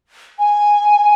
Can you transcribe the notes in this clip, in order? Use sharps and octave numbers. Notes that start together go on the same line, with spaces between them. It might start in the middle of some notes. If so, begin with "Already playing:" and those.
G#5